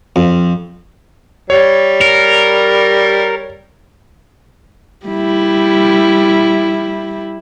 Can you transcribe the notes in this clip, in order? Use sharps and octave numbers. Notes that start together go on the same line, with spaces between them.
F2
G3 C#5
A#4
G3 E4